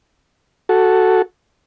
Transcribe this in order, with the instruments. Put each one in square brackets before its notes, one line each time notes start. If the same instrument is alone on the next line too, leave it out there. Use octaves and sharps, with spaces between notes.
[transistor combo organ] F#4 A4